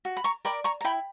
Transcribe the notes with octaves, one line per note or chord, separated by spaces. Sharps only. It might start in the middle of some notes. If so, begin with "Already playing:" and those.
F#4
B5
A#5 C#6
A#4 D5 G5 B5
A#5 C#6
A#5
E4 G5 B5